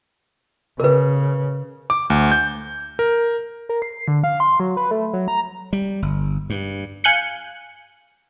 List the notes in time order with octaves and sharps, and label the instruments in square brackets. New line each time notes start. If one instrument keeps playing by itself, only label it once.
[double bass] C#3 [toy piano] A#4 B4
[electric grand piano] D6
D2
G6
A#4
[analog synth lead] A#4
C7
D3
F5
C6
F#3
B4
A3
F#3
A#5
[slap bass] G3
G1
G2
[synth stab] F5 G#5 F#6 G6 C#7